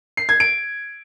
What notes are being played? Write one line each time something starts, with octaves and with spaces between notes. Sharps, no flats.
C7
G#6
D7